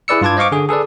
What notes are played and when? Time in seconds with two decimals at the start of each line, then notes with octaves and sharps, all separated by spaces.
0.08 E4 G#4 B4 D5 E6 C#7
0.21 G2 F4 B4 A5 D6 G#6
0.37 C5 D#5 F5 C#6 D6
0.52 D3 G#4
0.69 G#4 A4 B4 D5